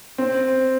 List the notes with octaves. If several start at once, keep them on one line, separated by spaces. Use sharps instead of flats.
C4